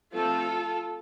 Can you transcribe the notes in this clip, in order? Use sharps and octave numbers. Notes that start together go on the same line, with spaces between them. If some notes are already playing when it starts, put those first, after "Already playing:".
F3 A3 C4 F4 A4